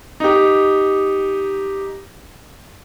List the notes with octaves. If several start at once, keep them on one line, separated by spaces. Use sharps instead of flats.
D#4 G4